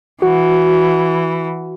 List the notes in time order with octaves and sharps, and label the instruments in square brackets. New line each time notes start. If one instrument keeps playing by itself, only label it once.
[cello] E3 [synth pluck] F#4